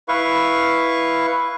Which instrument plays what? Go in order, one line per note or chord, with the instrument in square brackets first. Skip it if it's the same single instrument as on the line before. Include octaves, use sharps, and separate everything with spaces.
[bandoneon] E4 B4 F5 C#6